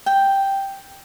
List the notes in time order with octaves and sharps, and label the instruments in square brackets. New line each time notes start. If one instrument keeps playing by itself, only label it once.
[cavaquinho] G5